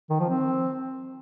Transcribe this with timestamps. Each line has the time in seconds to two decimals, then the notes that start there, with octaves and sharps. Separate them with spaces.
0.10 D#3
0.20 F3
0.29 C4